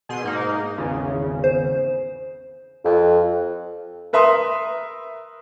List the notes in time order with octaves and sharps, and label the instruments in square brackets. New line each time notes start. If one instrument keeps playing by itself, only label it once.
[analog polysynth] B2 G#4 C6
G#2 A#3 D#4
G#1 E2 C#3
[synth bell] C5
[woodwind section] F2
[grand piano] A#4 B4 E5 A#5 C6 D#6